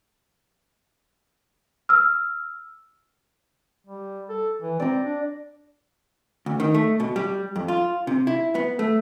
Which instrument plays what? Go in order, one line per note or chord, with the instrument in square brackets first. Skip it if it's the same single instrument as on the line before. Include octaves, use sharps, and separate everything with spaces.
[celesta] E6 F6
[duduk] G3
A4
E3
[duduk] C4 [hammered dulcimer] D5 A#5
[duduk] D4
[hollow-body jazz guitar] D2
D#3
A3
B2
G3
F2
F4
C3
E4
B3
A3